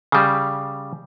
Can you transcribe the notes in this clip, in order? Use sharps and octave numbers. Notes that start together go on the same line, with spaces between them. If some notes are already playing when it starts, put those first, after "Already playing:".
C#3 G3